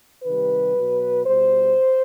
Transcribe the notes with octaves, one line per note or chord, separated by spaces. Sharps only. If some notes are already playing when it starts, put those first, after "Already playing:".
C3 D#3 G3 B4
B2 F#3
B2 G3 C5